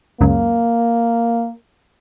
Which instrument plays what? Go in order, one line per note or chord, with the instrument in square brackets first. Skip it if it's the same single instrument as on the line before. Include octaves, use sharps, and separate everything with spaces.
[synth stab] C#2 F#2 [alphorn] A#3